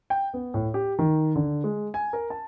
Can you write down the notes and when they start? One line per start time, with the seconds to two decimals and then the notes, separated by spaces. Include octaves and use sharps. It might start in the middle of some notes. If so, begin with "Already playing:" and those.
0.10 G5
0.34 B3
0.54 A2
0.74 G4
0.99 D#3
1.36 D3
1.64 G#3
1.94 G#5
2.13 A#4
2.30 A5